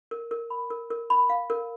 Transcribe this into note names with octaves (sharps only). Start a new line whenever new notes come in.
A#4
A#4
B5
A#4
A#4
B5
F5
A#4